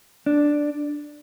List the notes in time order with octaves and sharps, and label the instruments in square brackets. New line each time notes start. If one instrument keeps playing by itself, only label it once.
[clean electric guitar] D4